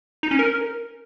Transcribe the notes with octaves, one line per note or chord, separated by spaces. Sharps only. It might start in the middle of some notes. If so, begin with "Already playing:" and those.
D#4
C#4
A#4